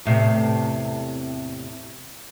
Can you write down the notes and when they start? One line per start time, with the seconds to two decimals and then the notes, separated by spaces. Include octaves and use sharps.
0.05 E2 A2 C3